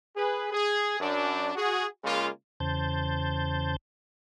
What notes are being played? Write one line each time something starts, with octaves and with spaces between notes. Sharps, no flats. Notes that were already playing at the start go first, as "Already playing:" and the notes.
G#4 B4
G#4
F#2 D4
F#4 G#4
C#3 G#3 A#3 F4
E2 C#3 C5 A5 G6